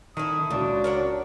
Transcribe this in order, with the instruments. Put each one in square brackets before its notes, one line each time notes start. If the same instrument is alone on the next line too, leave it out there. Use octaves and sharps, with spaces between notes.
[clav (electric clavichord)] D#3 [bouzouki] A3 E4 [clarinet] D#6
[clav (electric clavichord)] C#2 [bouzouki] A#2 [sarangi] D4 [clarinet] F#4
[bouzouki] A#4 C#5 F#5